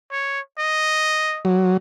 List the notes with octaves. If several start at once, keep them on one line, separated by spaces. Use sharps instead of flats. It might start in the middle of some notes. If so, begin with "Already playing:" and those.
C#5
D#5
F#3